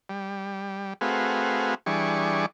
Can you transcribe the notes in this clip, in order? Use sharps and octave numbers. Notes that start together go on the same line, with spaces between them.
G3
A3 C4 F#4 G#4 B4 F5
E3 G3 D4 G#4 C#6